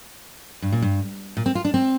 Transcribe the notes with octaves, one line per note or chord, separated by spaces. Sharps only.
G2
A#2
G2
A#2
C4
F4
D4
C4